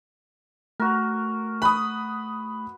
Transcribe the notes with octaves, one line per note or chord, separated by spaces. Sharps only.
A3 F#4 A#4
B4 B5 D#6